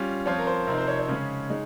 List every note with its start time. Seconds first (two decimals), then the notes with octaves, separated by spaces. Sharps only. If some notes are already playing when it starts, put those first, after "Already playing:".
Already playing: G3 C#4 F4 F5
0.26 F3 C4 F4 C#5
0.38 A#4
0.47 C5
0.67 C3 F3 C4 D#4 A#4
0.78 C5
0.88 C#5
0.99 C#5
1.08 C#3 G#3 C#4
1.50 G#3 D#4